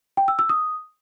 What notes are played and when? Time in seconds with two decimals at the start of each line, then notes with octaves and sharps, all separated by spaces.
0.17 G5
0.28 E6
0.39 E6
0.49 D#6